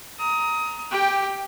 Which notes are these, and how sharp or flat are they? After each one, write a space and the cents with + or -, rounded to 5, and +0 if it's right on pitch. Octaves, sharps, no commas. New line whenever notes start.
A#5 +0 D#6 +25
G4 +0 G5 +15